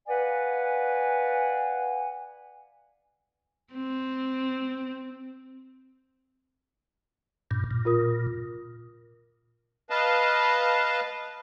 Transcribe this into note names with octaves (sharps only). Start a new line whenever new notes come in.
B4 D5 F5 F#5 G#5
C4
G2 A#2
A#2
F4 A#4 D#6
B4 D#5 F5 A5